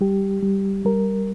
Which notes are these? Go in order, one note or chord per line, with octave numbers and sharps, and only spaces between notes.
G3 G4
G3
G3 A#4